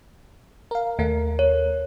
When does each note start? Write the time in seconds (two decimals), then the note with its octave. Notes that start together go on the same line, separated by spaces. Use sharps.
0.71 A#4 F5
0.98 D#2 A3 A#4
1.39 C#5